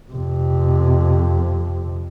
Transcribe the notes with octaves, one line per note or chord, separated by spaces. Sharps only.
F2 C3